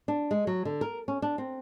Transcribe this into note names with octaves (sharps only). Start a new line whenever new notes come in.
D4
G#3
F#3
D3
A#4
C#4
D4
C4